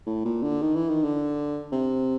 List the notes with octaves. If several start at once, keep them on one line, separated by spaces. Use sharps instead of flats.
A2
A#2
D3
D#3
E3
D#3
D3
C3